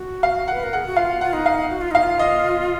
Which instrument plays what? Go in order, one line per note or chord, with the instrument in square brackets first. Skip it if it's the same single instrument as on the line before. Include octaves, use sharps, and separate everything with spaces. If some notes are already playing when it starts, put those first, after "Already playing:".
Already playing: [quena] F#4
[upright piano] F5
[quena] B4 [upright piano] F#5
[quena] A#4
[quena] G#4 [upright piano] F#5
[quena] F#4
[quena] F4 [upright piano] F5
[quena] F4 [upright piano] F#5
[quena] D#4
[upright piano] F5
[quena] F#4
F4
[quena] D#4 [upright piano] F5
[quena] F4
[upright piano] D#5